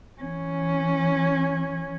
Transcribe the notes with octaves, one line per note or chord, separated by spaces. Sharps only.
E3 C#4